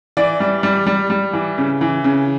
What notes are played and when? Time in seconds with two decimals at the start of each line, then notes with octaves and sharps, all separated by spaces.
0.17 E3 D5
0.40 G3
0.63 G3
0.87 G3
1.10 G3
1.33 E3
1.58 C#3
1.81 E3
2.04 C#3